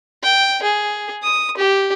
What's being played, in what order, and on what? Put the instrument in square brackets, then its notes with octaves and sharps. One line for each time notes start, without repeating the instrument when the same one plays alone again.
[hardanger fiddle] G5
G#4
D#6
G4